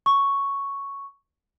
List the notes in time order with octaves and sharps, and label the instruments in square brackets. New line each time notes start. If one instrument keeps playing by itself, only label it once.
[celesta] C#6